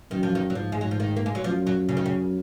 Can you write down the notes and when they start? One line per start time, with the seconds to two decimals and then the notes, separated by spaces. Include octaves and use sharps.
0.11 F#2 D#3
0.23 F3
0.35 D#3
0.50 F#3
0.55 G#2 F3
0.72 G#3
0.81 F#3
0.91 F3
1.00 D#3
1.17 A#3
1.26 G#3
1.35 F#3
1.44 F#2 F3
1.67 F#3
1.89 C#3
1.97 D#3
2.06 C#3